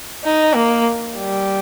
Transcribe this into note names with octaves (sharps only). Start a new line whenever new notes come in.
D#4
A#3
G3